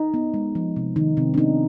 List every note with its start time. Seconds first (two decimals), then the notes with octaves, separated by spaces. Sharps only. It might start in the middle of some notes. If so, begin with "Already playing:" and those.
Already playing: D#4
0.14 B3
0.34 G#3
0.55 F3
0.76 C3
0.96 D#3 D#4
1.17 C3 C4
1.34 D4
1.38 B3 D#4